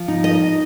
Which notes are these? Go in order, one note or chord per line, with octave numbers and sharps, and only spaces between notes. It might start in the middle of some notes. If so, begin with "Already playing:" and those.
Already playing: F3
D#4
D#5